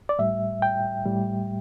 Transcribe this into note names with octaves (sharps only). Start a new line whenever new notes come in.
D5
A2 G3 E5
G5
A2 G3